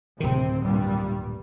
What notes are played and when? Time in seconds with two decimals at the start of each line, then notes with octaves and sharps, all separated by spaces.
0.20 D1 C3 D#3 C4
0.63 G2 A#2 G3